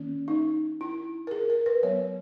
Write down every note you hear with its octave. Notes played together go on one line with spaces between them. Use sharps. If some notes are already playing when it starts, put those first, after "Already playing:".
Already playing: D#3 A#3 C#4
D#4
E4
A#4
G#4
A#4
B4
F#3 B3 C#5